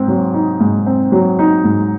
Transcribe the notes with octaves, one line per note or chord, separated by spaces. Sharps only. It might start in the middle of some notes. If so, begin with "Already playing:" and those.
Already playing: G#2 C4
F#3
D#4
G#2
C4
F#3
D#4
G#2